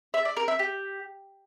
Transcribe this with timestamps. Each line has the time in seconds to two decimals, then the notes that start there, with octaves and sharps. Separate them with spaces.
0.14 E5
0.25 D5
0.37 A#4
0.48 E5
0.59 G4